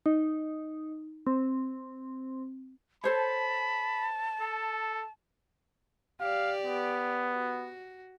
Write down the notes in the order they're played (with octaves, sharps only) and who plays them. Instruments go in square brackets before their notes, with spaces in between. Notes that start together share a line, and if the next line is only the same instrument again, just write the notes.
[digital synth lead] D#4
C4
[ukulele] A4 C5 C#5 [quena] A5 [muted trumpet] B5
[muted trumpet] A4
[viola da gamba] G4 D5 [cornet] F5
[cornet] B3
[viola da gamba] F#4